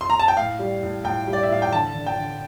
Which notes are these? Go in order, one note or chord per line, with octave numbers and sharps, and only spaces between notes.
C6
A#5
A5
G5
A2 F5
G3
A2
A2 G5
G3
D5
E5
A2 F5
G5
D3 A5
D3
G5
D3